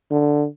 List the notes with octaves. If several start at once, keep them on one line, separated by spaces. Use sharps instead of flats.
D3